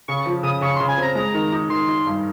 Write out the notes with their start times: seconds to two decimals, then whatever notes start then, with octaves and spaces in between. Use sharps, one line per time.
0.08 C#3 C#6
0.26 F3
0.43 C#3 D#6
0.61 C#3 C#6
0.76 C6
0.80 C#3
0.89 G#5
0.97 C4 A#5
1.15 G#3 A#5
1.34 D#3
1.52 D#4
1.69 D#3 C6
1.88 D#4
2.06 G2